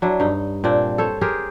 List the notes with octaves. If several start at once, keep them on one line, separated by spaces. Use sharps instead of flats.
F#3 D4 E4
G2 D#4
A#2 C4 D4 D5
A4 C5 C#5
G4 G#4 A#4 C5